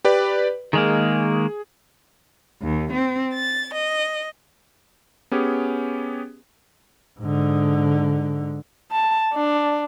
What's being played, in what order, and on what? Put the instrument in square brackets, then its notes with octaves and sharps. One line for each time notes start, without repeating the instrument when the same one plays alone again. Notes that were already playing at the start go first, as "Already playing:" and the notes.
[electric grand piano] G4 B4 D5
[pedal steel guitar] D#3 G#3 A#3 [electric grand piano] G#4
[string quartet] D#2
C4
A6
D#5
[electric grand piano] B3 C#4 G4 G#4
[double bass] G#2 D3
[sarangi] A5
D4